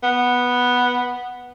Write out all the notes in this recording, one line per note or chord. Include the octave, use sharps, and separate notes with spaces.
B3